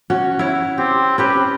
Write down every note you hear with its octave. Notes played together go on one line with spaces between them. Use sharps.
C#4 F#4
E4 C#5
C4 G4
C#4 G4 B4 C5